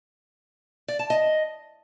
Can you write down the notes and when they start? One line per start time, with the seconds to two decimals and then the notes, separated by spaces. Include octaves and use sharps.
0.88 D5
0.99 A5
1.10 D#5